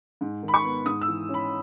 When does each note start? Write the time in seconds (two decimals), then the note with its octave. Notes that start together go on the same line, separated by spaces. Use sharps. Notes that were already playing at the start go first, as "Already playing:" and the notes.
0.21 G#2
0.43 D#3
0.48 B5
0.54 C#6
0.64 B3
0.86 G#2 D#6
1.01 E6
1.07 E3
1.29 C#4
1.34 B5